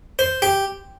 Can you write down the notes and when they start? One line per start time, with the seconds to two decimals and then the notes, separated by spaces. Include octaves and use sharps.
0.19 C5
0.42 G4